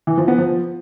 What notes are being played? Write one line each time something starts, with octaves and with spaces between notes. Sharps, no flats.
E3
F3
B3
F3